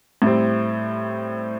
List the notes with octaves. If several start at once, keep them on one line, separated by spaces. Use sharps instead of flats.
A2 G3 C4